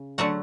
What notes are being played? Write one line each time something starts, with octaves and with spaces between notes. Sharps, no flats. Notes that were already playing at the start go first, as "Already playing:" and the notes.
Already playing: C#3
D3 F#3 A3 F#5